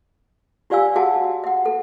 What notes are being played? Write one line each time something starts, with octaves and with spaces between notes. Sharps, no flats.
F4 G4 D5 F5 G#5 E6
F#4 G#4 E5 F#5 A5
E5 F#5
A4